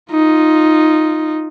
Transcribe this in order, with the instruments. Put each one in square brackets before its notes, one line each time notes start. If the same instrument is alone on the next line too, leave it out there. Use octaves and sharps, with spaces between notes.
[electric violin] D#4 F4